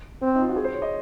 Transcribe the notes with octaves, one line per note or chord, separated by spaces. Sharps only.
C4
D#4
F4
F#4
G#4
C5
C#5
D#5